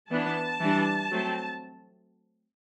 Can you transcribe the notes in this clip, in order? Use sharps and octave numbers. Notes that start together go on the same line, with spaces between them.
E3 B3 D4 A5
E3 G3 D4
F#3 A3 C4